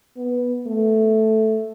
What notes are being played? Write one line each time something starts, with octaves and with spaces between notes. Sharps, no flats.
B3
A3